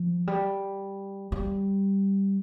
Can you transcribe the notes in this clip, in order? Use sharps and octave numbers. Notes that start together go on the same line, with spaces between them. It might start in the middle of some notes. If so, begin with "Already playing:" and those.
Already playing: F3
G3
G3